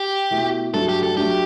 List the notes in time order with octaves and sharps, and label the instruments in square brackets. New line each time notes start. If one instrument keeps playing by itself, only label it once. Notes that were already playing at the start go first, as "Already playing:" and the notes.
Already playing: [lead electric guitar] G4
[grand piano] B2 A3 E4
[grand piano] G2 F#3 A3 D4 [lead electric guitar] A4
[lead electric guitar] G4
A4
[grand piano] F#3 A3 D4 [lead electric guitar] G4